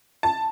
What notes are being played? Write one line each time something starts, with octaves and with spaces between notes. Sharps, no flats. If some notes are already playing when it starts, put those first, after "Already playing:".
A5